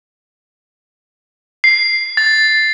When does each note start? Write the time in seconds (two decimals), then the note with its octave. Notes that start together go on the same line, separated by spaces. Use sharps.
1.64 C7
2.17 A6